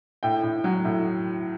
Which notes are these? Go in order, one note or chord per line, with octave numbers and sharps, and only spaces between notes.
A2 G5
A2
F#3
A2